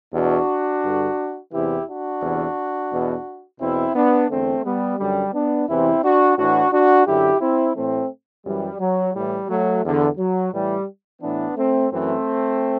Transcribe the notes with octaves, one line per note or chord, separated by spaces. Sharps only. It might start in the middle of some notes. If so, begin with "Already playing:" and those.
E2 B2 D4 F#4
G2 D3
E2 C3 E3 E4 G4
D4 F#4
E2 C3 E3
E2 B2
E2 B2 C4 E4
B3 D4
E2 D3 A3 C4
G3 B3
F#2 D3 G3
B3 D4
E2 C3 E3 C4 E4
D4 F#4
A2 E3 D4 F#4
D4 F#4
F#2 D3 E4 G4
C4 E4
A2 E3 A3 C4
F#2 E3 G3
F#3
A2 E3 G3
F#3 A3
E2 D3
F#3
A2 E3 G3
A2 E3 B3 D4
A3 C4
F#2 E3 A3 C4